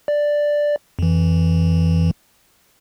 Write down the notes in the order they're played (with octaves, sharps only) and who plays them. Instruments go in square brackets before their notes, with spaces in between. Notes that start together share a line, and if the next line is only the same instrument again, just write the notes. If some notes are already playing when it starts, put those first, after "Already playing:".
[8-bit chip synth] D5
F2 E3